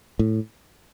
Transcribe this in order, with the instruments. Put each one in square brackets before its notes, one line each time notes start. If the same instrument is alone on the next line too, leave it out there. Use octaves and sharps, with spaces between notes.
[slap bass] A2